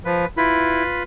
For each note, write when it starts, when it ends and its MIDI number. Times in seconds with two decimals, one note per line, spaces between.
0.05 0.25 53
0.05 0.27 71
0.37 0.83 64
0.37 1.03 65
0.37 1.03 71
0.37 1.03 83